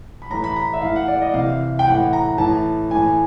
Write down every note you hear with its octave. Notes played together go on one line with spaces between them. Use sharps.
B5
A2 E3 A#5
B5
A#5
E5
A2 E3 F5
F#5
D5
D#5
C3 E3 F5
G5
A2 E3 F#5
A#5
A2 E3 A5
A2 E3 G#5